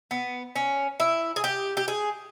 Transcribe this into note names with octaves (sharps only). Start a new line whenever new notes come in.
B3
C#4
E4
G#4
G4
G4
G#4